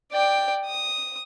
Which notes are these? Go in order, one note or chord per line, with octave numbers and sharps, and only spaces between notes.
D5 G5
D#6